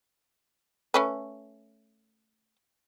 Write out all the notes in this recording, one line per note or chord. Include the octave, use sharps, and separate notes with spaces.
A3 C#4 B4